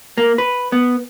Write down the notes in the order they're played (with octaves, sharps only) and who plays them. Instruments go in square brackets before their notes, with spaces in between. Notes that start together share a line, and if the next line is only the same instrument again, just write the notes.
[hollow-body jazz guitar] A#3
B4
B3